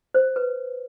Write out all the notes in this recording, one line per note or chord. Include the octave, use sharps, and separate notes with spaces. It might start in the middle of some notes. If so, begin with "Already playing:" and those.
C5
B4